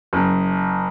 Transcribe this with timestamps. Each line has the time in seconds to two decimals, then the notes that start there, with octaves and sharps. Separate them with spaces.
0.13 F#1